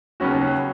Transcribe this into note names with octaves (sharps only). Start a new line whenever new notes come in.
D#2 C#3 F#3 B3 C#4 F#4